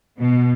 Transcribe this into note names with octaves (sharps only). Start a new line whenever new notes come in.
B2